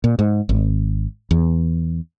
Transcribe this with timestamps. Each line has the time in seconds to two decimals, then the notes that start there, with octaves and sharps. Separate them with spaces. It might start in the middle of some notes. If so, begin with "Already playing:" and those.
0.04 A#2
0.19 G#2
0.49 G#1
1.31 E2